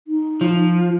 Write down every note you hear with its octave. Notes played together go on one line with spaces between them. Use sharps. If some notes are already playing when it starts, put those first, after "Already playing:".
D#4
F3